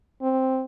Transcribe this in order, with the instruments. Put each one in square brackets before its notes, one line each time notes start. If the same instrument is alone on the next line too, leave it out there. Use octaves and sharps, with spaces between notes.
[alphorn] C4